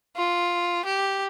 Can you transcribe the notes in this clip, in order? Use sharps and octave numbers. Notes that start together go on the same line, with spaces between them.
F4
G4